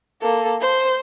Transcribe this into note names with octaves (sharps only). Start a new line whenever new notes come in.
A#3 A4
C5